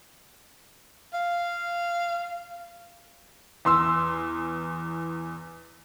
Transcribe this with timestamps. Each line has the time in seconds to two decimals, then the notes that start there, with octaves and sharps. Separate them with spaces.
1.14 F5
3.65 E2 C6 E6